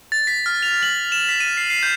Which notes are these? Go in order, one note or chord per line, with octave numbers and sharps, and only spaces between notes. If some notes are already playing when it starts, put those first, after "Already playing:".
A6
B6
F6
F7
F#7
E7
B6
D#7
C7
C7
G6